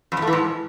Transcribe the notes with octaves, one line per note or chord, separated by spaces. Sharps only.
F2
E2
A3
E3
G#2